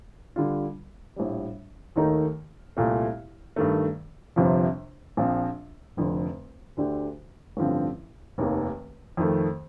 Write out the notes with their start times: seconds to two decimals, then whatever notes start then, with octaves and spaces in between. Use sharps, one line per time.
0.36 D3 G3 D4 F4
1.16 A#1 A2 G3
1.96 D#2 D#3 A3 D#4 A#4
2.77 C2 A#2 A3
3.56 G2 D#3 A3
4.36 G1 F2 C3 F3
5.17 A#1 A#2 F3 C4
5.97 F1 F2 D3
6.77 D2 D3 A3 D4 G4
7.57 A1 G2 D3 F3 C4
8.38 F1 D#2 D#3 A#3
9.17 F2 D#3 A3